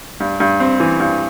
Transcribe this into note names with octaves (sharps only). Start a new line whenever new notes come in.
G2
G2
C4
E3
G2